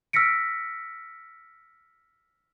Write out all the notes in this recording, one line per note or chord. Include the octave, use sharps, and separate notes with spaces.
E6 F6 A#6 B6 C#7 D7